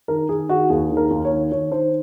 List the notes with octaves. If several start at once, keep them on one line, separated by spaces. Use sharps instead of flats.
D#3 A#4
D#3 G#4
D#3 F#4
D#2 G#4
D#3
A#4
D#2
C#5
D#3
D#3 C#5
D#3 C5